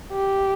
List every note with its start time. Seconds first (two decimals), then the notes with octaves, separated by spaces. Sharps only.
0.12 G4